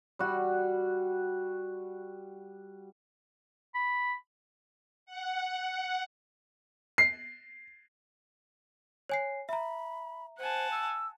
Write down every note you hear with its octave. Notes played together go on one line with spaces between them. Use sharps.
G3 F#4
B5
F#5
C7
C#5 G#5 C7
E5 A#5 B5
C5 F#5 G#5 A5
E6